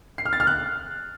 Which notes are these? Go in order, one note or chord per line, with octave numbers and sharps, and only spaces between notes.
C7
F6
A6
F6
F#6